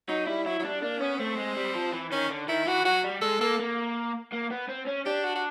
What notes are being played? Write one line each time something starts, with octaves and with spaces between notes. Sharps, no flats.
F#3 D#4
G3 E4
F#3 E4
F#3
G3 D4
A#3 D4
B3 C#4
A3 C4
G#3
G3
F3
E3
D#3 C#4
D3
D#3 E4
E3 F#4
F#3 F#4
G3
G#3 A4
A#3 A4
A#3
A#3
B3
C4
C#4
D4 G4
F#4
F#4